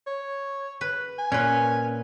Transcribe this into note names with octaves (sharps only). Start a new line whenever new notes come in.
C#5
B4
G#5
A#2 C#4 B4